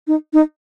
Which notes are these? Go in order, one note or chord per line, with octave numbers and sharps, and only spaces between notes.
D#4
D#4